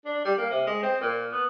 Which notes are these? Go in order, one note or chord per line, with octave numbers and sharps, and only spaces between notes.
D4
G3
A#3
C3
G#3
C4
A#2
B3